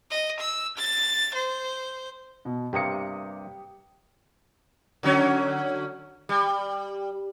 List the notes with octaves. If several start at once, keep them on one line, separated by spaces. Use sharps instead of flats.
D#5
E6
A6
C5
B2
G2 C3 A#3 G4 D#6 C#7
D3 F#3 C#4
G3